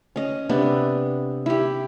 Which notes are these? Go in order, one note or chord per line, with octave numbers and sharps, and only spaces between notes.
C#4 D#5
C3 B3 D4
E4 G4